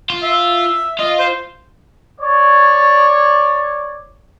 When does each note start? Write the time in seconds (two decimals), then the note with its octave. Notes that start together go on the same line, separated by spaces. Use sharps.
0.10 F4
0.23 E5
0.99 F4 D#5
1.19 C5
2.20 C#5 D5